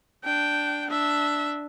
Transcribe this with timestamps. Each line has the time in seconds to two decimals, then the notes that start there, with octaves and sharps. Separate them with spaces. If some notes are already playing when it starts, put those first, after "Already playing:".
0.24 D4 G5
0.90 D4 E5